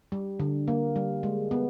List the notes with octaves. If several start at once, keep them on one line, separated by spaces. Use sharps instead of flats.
G3
D3
A#3
G3
G#3
B3